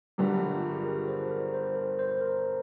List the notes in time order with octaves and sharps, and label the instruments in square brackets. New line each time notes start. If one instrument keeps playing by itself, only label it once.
[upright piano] G1 G2 D3 G3 [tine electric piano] A#4
[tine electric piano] F4
G4
G#4
A#4
C5
A#4
C5
A#4
C5
A#4